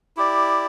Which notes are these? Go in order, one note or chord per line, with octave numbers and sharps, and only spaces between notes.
E4 G4 D5